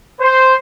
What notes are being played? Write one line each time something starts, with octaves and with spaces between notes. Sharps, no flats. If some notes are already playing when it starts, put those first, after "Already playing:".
C5